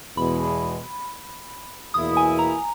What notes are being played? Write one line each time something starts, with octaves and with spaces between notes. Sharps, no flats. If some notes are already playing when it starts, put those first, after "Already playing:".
E2 B2 G#3 B5
E2 B2 A#3 E4 D#6
G#5
A#5